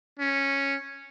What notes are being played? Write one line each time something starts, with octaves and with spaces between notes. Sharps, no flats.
C#4